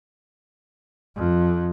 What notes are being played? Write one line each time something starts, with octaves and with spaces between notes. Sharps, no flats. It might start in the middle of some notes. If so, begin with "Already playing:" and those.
F2